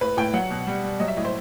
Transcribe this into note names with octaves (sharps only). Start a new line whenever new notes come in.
A2 B4
A2 G5
F#3 F#5
B2
G3
G3
F#3 D#5
E5
A2 D#5
C5